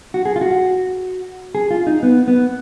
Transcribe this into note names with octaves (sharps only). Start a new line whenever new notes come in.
F#4
G#4
F4
F#4
G#4
F4
D#4
B3
B3